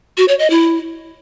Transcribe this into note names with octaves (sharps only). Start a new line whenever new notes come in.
F#4
C#5
D#5
E4